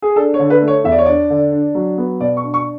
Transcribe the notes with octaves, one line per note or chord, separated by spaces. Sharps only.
G#4
D4 A4
C#5
D3
B4
A3
C#5
E2 E5
D5
C#5
D4 D5
D3
D4
F#3
B3
B2 D5
C#6
D4
C#6